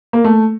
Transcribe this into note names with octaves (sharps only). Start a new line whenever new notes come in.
A#3
A3